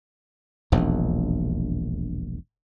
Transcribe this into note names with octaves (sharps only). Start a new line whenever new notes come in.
E1 A#1 D#2